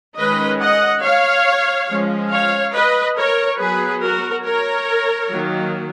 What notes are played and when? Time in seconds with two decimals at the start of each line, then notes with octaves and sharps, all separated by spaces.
0.16 D#3 G#3 C#4 B4 D#5
0.59 D#5 F#5
1.02 C#5 F5
1.88 F3 G#3 C#4
2.31 C#5 F5
2.74 B4 D#5
3.17 A#4 C#5
3.59 F#3 B3 G#4 B4
4.02 F#4 A#4
4.44 A#4 C#5
5.30 D#3 F#3 A#3